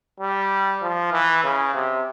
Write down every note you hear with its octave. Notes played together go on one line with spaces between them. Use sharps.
G3
F3
E3
C#3
C3